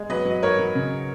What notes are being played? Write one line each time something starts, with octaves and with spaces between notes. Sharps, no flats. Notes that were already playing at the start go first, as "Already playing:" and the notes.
Already playing: G#3
F#3 B4 D#5
F#3
D#5
G#2 A#4 C#5
F#3
C#3